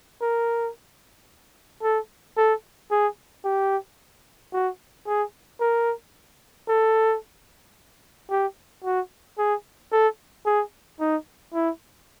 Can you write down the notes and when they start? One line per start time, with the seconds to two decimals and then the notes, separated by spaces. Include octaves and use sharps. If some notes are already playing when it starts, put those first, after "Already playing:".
0.22 A#4
1.83 A4
2.38 A4
2.91 G#4
3.45 G4
4.53 F#4
5.07 G#4
5.61 A#4
6.68 A4
8.30 G4
8.84 F#4
9.38 G#4
9.92 A4
10.46 G#4
11.00 D#4
11.54 E4